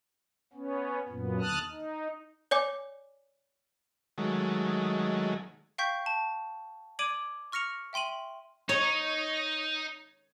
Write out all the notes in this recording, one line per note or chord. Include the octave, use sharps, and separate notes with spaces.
B3 C#4
F#2 A#2 B3
D#2 D3 A5 D#6 F6 F#6
D#4
C#5 D5 G#5 D6
D#3 F#3 G#3 A3
F5 G5 C#6 G6 B6
A5
D5 D6 G#6 D7 D#7 F#7
C#6 F6 A#6 C#7 F7
E5 G5 C6 D#7 F#7
D#4 C#5